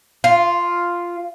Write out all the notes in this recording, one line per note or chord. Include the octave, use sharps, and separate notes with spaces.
F4